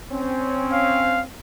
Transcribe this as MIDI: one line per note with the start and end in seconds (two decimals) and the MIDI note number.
0.10 1.24 60
0.10 1.24 61
0.73 1.21 77